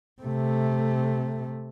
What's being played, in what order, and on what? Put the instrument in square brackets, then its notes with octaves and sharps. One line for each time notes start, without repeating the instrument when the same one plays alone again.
[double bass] C3 A3